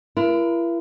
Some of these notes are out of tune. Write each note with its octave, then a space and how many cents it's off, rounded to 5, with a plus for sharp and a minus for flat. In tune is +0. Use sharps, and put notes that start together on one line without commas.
E4 +40 A#4 +35